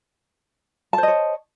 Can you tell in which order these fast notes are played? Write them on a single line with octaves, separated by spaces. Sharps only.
A5 C5 D#5 C#5